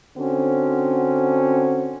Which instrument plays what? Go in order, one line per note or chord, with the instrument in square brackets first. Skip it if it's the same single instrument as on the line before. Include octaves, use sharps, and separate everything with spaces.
[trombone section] D3 C4 C#4 F#4